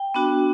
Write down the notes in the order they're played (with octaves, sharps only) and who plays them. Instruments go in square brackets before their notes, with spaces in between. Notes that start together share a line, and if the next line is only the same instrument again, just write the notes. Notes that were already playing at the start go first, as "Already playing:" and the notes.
Already playing: [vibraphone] G5
B3 D4 F#4